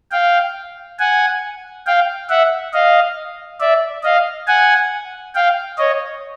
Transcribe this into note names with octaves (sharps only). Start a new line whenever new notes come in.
F5 G5
F#5 G#5
F5 G5
E5 F#5
D#5 F5
D5 E5
D#5 F5
F#5 G#5
F5 G5
C#5 D#5